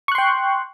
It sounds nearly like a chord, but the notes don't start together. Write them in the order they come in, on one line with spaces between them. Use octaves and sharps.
C#6 F#6 C6 G5